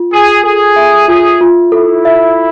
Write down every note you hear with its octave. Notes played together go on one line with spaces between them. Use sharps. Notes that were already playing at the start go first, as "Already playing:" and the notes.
Already playing: F4
F4 G#4
G#4 A4
E5
F4 G#4
F4
E4 A4
E5